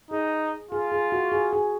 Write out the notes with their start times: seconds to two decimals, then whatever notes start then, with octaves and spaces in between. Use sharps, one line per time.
0.11 D#4 G#4
0.71 F4 G#4
0.92 G#4
1.12 F#4
1.32 G#4
1.53 G#4